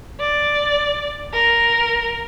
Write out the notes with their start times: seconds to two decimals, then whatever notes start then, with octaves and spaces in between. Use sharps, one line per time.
0.20 D5
1.33 A#4